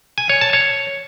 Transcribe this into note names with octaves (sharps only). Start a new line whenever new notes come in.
G#5
C#5
A5
C#5